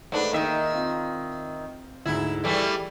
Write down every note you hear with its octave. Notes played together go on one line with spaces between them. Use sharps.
G#2 A3 D4 B4
D#3 A#3 E5
C4 F4
D2 G#2 E4
E3 G3 A3 G#4 D5